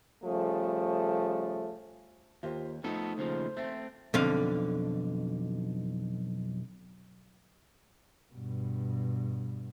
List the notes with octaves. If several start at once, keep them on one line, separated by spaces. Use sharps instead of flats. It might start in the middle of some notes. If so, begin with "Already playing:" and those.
C#3 F3 G3 A3
D#2 F4 G4 C5
F3 A3 B3 D#4 A4
D#2 C#3 F3 C5
A3 C4 E5
B1 F2 D3 F5
G2 B2